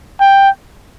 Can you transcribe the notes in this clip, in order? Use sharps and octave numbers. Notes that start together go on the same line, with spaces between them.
G5